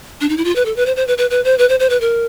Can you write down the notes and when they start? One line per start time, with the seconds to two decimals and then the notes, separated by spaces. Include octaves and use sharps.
0.21 D4
0.29 D#4
0.37 E4
0.45 F4
0.56 B4
0.65 A4
0.76 B4
0.86 C5
0.96 C5
1.07 B4
1.18 B4
1.30 B4
1.44 C5
1.58 B4
1.69 C5
1.80 C5
1.90 B4
2.01 A#4